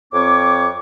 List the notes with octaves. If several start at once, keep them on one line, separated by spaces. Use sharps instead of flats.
F2 C4 C#5 D6